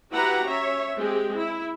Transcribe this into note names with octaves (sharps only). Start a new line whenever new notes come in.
E4 F#4 G4 B4 F#5 A#5
C#4 C#5 E5
G#3 C4 G4 G#4
E4